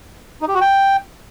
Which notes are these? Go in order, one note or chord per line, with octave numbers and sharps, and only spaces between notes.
D#4
G4
F#4
G5